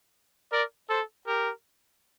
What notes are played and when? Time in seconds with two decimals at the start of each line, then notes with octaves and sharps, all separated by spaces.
0.53 A#4 D5
0.90 A4 C5
1.27 G4 A#4